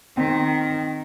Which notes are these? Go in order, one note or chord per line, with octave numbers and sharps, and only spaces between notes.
D#3 C4